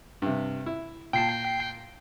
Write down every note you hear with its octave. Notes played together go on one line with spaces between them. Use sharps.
G2 C3
E4
A#2 G5 A5 C7